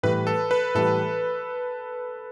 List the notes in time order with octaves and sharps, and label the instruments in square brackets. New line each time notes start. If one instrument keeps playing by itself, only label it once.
[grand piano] A2 E3 G3 [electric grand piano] B4
[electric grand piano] A4
B4
[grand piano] A2 E3 G3 [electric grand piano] A4